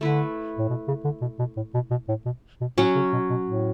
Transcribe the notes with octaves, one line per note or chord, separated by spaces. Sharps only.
D3 A3 E4 B4
A2
B2
C#3
D3
B2
B2
A2
B2
B2
A2
B2
B2
A2 F#3 C#4 F#4
C#3
B2
B2
A2